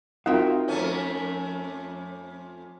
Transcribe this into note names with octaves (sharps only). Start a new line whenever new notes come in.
C4 D#4 F4 F#4 A#4 E5 F5 G5
F2 A3 C#4 C5